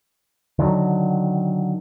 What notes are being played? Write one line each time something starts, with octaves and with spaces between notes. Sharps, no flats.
D3 D#3 F#3